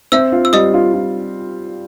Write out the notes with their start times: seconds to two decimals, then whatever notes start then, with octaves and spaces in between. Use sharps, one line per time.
0.12 C4 E5 E6
0.32 F4
0.45 E6
0.53 G3 D#5 D#6
0.74 F4
0.94 F4